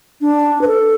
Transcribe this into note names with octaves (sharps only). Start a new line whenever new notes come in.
D4
B4
A4